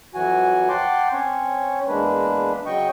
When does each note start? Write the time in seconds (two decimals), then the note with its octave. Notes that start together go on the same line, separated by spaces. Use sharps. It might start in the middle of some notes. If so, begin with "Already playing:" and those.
0.14 F2 E3 F#3 F#4 G#5
0.69 F#5 G5 A5 C6 D6
1.13 C4 C#4 C#5
1.88 E2 G#3 A#3 D4 B4
2.66 C#3 F#3 D#5 G5 C#6